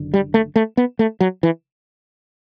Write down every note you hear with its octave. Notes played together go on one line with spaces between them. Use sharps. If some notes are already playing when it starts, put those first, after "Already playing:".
Already playing: F#1 F#2 D3
G3
A3
A3
B3
A3
F#3
E3